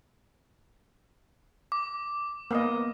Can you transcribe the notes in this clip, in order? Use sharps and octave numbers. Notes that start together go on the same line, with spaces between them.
D6
A#3 B3 D#5